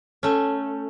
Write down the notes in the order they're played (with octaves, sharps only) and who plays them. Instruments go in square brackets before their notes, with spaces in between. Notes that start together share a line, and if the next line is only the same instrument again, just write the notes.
[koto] A3 C#4